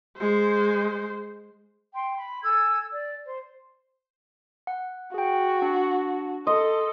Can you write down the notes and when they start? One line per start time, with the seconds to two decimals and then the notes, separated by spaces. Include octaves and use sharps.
0.18 G#3 C5
1.92 G5 C6
2.16 B5
2.42 A4 G#5 E6 G#6
2.91 D5
3.26 C5
4.67 F#5
5.14 F#4 G#4 G5
5.62 D4
6.47 A4 D#5 C6